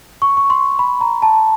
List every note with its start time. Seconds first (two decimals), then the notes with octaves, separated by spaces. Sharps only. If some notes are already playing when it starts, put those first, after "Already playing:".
0.22 C#6
0.37 C#6
0.50 C6
0.79 B5
1.01 A#5
1.22 A5